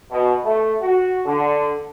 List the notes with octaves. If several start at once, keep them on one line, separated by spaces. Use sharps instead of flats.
B2
A3
F#4
D3